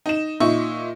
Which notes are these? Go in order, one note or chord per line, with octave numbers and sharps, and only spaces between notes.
D#4 E7
A#2 D#4 E5 C#6